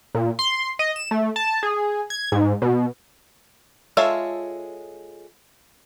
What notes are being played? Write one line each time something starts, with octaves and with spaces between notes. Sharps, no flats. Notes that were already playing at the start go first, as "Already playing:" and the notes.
A#2
C6
D#5
E7
A3
A5
G#4
G#6
G#2
B2
G#3 F4 A4 C#5 E5